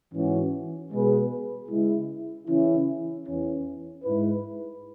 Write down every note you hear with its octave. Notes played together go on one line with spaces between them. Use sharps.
G#2 E3 C#4 F#4
B2 G#3 B3 G#4 B4
C#3 G#3 E4
C#3 E3 C#4 E4
E2 E3 C#4
G#2 G#3 E4 B4